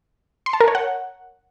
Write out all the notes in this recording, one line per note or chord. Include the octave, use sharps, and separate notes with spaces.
C6
A5
A#4
C#5
F#5